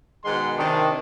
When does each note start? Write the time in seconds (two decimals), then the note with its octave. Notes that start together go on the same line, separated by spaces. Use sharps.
0.24 G#2 B2 D#3 G#3 F#5 C6
0.58 C3 D#3 D4